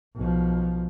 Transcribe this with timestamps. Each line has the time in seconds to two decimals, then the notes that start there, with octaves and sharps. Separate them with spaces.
0.16 B1 F3